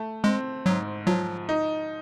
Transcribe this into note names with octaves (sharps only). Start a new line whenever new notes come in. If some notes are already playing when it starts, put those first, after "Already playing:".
Already playing: A3
G#3 C4
G#2 F#3
F3 F#3
D#4